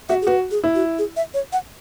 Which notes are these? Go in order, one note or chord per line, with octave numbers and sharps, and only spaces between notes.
F#4 E5
G#4
F#4 B4
G#4
E4
F#4
G#4
E5
C#5
F#5